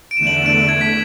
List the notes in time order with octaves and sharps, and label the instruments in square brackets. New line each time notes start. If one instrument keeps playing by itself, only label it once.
[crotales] D7
[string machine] E2 D3 A3 D4 [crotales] E7
[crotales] F#7
E7
D7
G#6
B6